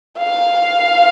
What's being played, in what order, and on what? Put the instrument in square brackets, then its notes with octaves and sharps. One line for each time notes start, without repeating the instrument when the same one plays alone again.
[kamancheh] F5